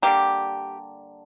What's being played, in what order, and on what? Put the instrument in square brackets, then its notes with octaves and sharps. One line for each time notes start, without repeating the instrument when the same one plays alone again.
[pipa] D3 G3 A#3 G4